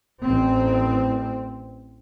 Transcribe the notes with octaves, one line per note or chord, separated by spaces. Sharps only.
A1 C4